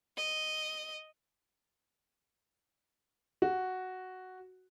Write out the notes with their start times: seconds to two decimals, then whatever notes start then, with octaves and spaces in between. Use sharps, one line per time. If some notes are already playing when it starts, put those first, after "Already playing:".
0.17 D#5
3.42 F#4